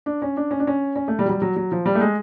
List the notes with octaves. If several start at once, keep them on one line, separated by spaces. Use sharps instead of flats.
D4
C#4
D4
C#4
D4
C#4
C#4
A3
G3
F#3
G3
F#3
F#3
F3
G3
A3
G#3